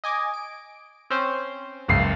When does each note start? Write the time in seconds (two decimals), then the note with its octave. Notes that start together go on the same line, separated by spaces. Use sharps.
0.04 D#5 G#5 D6
0.34 D7
1.10 C4 C#4 C5
1.88 F#1 C#2 C7